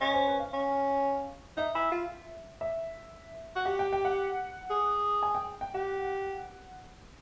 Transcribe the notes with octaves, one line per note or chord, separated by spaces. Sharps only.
C#4 D#5
C5
B4
F5
C#4
D#4 E5
E4
F4
E5
F#4
G4 F#5
G5
G5
F#5
G#4
G#5
G5
G5
G4 F#5